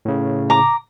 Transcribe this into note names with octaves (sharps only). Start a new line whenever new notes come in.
A2 C#3
A#5 D6